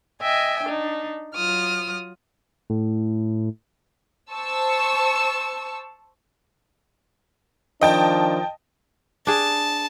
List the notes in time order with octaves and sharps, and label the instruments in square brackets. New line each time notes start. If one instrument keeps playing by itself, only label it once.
[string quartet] D#5 E5 G5 G#5
D4 D#4
F#3 F4 D#6 F6
[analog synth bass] A2
[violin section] C5 A5 C#6 E6
[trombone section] D#3 F3 D4 [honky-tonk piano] D#5 G5 A5
[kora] D4 G#4 [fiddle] A5